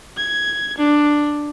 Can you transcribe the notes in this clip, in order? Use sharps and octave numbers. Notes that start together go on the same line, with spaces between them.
G#6
D4